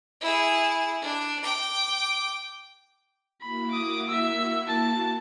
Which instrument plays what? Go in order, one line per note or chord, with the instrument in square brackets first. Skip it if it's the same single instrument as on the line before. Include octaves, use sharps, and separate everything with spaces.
[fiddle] E4 G#4
D4
G5 D6
[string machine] A#3 E4 F#4 [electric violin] B5
[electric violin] D6 D#6
E5 E6
A5